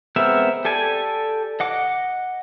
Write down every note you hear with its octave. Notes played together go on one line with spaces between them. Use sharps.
G#3 B3 C4 A#4 E5
G4 A4 D5 G#5
D#5 F#5 D6